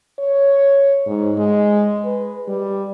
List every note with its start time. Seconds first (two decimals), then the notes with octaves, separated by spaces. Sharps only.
0.19 C#5
1.07 G#2
1.38 G#3
2.05 B4
2.48 G3